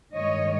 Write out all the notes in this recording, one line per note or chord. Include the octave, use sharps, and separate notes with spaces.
G2 D#3 G#3 C#5 D#5